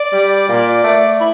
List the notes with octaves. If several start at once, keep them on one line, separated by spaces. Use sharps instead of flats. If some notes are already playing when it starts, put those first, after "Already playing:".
Already playing: D5
G3
A#2
A3
E4